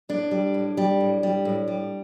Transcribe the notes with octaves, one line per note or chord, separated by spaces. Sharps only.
A2 D4
G3
A2
G3
A2
G3
A2
G3